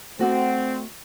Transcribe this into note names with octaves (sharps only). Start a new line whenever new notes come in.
A3 C4 F#4 D5